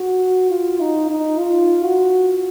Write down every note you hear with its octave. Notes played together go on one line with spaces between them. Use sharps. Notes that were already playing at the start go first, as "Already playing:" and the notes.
Already playing: F#4
F4
D#4
D#4
F4
F#4